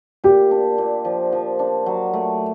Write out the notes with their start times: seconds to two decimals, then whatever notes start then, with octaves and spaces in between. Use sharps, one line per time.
0.24 A#2 G4
0.51 D4
0.78 A#2
1.05 F3
1.32 F3
1.59 D4
1.86 F#3
2.14 A3